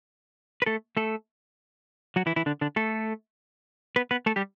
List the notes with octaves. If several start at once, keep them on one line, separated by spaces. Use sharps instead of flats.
B4
A3 A4
A3 A4
F#3 F#4
E3 E4
E3 E4
D3 D4
D3 D4
A3 A4
B3 B4
B3 B4
A3 A4
G3 G4